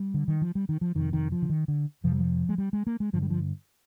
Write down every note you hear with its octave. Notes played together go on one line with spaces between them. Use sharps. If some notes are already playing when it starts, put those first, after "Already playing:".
Already playing: G3
D3
D#3
F3
G3
D#3
F3
F2 C3 D#3
D#3
F3
D3
D#3
D3
F2 C3 F3
G3
F3
G#3
G3
G#3
A#3
G#3
G2 D3 F3
G3
F3